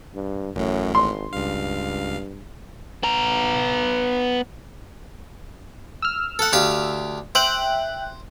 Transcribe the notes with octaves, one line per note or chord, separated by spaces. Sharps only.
G2
A1 F#2 A2
G#1 C6
C#2 G2 F5
B3 A#5
E6 F6
A4 F#5
D2 G4 F5
C5 E5 G5 F#6